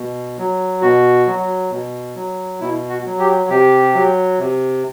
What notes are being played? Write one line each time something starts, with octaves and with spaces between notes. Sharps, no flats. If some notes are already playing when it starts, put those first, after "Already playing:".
Already playing: B2
F#3
B2 F#4
F#3
B2
F#3
B2 E4
F#4
F#3
G4
C3 G4
F#3
C3